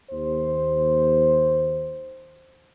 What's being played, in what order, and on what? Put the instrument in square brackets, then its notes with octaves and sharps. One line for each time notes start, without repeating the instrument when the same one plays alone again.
[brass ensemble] D#2 C5